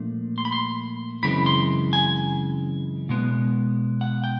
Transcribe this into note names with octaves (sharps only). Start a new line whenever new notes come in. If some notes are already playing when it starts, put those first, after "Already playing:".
Already playing: A#2 F3 A3 D4
C6
B5
C6
F#2 C#3 E3 G#3 C4 B5
C6
G#5
B2 G#3 B3
F#5
G5